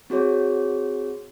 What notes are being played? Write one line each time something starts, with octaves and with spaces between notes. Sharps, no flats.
C4 F#4 G#4 C#5